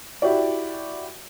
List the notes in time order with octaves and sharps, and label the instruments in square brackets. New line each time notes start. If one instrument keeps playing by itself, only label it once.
[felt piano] E4 F#4 G4 D5